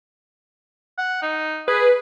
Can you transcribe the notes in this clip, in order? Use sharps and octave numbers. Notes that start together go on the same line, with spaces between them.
F#5
D#4
G#4 B4